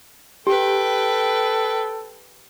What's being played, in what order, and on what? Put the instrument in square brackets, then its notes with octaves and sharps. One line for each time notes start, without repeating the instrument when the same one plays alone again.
[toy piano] G4 [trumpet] A4 [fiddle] B4 G5